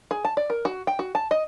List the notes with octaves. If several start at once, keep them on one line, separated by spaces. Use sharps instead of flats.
G#4
A5
D5
A#4
F#4
G5
F#4
A5
D#5